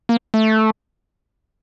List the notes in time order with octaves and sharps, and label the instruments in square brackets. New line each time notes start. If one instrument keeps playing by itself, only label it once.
[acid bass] A#3
A3